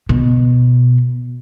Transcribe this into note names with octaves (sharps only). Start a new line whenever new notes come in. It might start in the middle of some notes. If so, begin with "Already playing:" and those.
B2